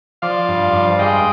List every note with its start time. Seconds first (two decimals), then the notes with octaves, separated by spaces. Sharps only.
0.22 F3 D5 F5
0.48 G2
0.73 G2
0.99 G#3 D#5 G5